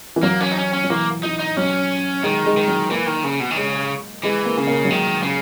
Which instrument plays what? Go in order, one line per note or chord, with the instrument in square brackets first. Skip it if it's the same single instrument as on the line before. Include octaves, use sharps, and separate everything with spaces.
[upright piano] E3
[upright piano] F#3 [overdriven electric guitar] A#3
[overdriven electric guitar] C#4
D#4
C#4
C#4
[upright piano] F#3
[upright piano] E3 [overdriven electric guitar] A#3
[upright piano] E3 [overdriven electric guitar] D#4
[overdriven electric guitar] D#4
[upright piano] F#3 [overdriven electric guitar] C#4
[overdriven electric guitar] D#3 [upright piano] G#3
[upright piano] G#3
[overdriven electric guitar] D#3
[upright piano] F#3
[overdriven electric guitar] E3 [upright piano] A#3
[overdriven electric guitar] D#3
C#3
B2
D#3
[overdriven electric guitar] C#3 [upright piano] G#3
[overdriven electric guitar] E3 [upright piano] G#3
[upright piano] A#3
[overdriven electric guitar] C#3
[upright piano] A#3
F#3
[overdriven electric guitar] D#3 [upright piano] G#3
[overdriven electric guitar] C#3